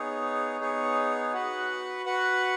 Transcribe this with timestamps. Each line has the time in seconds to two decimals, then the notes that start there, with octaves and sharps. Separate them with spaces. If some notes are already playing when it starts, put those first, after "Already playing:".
Already playing: B3 D#4 G#4 C#5
0.60 B3 D#4 G#4 C#5
1.33 F#4 B4 F#5
2.06 F#4 B4 F#5